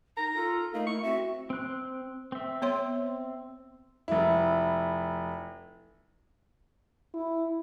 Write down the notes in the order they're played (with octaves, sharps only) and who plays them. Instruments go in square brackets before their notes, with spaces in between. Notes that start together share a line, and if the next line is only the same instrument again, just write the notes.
[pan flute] D#4 [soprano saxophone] A#5
[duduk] F4 [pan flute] A4
[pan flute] A3 [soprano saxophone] A#3 [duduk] D#4
[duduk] E4 [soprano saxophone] C#6
[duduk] C4 [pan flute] F#4 [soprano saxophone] E5
[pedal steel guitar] C4 F#6
C4 E5
[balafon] B3 C#5 C6
[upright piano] F1 E4
[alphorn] E4